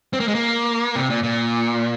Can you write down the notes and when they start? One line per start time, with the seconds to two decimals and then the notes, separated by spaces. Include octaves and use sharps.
0.13 C4
0.20 A#3
0.28 G#3
0.35 A#3
0.96 C3
1.10 A#2
1.23 A#2